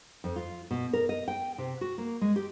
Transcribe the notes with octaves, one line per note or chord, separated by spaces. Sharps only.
F2
F4
B2
A#4
D#5
G5
C3
F#4
A#3
G#3
G4